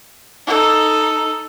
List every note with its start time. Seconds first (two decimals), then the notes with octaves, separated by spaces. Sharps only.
0.47 D#4 A4